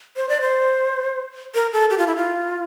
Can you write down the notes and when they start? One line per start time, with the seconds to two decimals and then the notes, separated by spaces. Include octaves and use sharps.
0.16 C5
0.29 D5
0.41 C5
1.55 A#4
1.73 A4
1.90 G4
1.98 F4
2.07 E4
2.16 F4